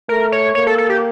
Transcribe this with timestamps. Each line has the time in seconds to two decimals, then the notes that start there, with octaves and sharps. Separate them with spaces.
0.09 A3 A#4
0.32 C#5
0.55 A#3 C#5
0.67 A4
0.78 A4
0.90 G4